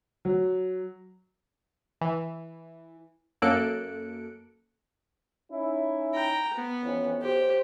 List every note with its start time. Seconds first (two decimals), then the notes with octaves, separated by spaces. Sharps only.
0.25 F#3
2.01 E3
3.42 F#2 A#3 A4 F#6 C#7 D7
5.51 C#4 D#4 E4
6.14 G5 A#5
6.54 B3
6.84 F2 E3 C#4
7.22 B1 G4 C5